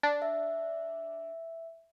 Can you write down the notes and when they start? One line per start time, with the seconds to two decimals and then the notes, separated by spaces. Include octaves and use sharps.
0.03 D4
0.22 E5